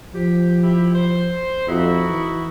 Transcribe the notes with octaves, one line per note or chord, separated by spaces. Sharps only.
F3 G4
E4 G4
C5
F2 D#4 E4 F#4
E3